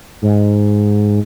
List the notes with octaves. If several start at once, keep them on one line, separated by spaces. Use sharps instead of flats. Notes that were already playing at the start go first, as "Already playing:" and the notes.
G#2